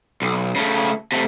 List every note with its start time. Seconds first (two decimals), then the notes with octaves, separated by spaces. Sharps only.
0.22 B1
0.56 C#3 A3
1.12 C3 A3